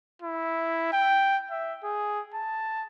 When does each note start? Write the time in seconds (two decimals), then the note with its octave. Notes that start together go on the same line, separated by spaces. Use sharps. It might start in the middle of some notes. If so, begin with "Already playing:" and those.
0.22 E4
0.92 G5
1.50 E5
1.84 G#4
2.34 A5